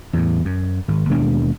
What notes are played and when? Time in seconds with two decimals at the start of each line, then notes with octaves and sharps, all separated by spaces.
0.13 E2 A2
0.45 F#2
0.88 G#1
1.10 D#2 B2 G#3 D4